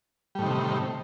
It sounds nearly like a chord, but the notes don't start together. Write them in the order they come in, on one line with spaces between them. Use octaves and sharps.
G3 A2 D#3 C3